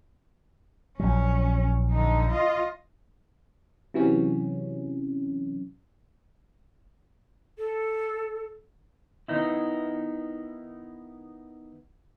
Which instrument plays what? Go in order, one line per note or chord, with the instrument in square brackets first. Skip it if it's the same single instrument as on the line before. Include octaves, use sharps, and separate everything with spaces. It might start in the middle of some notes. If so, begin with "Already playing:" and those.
[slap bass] A#1 A#2 F#3 [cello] C#4
[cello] D3 D#4
F4 D#5
[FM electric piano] C3 E3 F#3 C#4
[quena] A4
[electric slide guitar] D#3 B3 D#4 E4